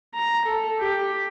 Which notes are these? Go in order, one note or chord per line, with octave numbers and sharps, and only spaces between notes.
A#5
A4
G4